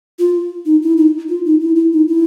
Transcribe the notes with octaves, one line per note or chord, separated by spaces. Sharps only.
F4
D#4
E4
D#4
F4
D#4
E4
E4
D#4
E4